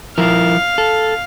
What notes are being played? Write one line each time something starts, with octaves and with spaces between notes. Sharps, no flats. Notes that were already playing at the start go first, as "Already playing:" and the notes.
F3 E4 A#4 F5
A4